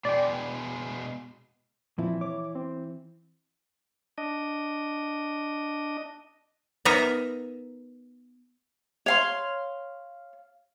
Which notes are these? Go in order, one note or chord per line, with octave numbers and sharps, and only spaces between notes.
B2 G#3 D5 G5
A#2 E3 F3 C4 E4
C#5 D6
C4
D4 D#5
B3 D#4 A#4 E5 A#5
C#5 F5 C6